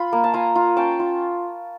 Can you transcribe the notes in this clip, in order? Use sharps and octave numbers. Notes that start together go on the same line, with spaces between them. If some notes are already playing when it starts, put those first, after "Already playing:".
Already playing: F4 B5
A#3
A5
F4 G#5 A#5
F4
C#4 G5 A5
F4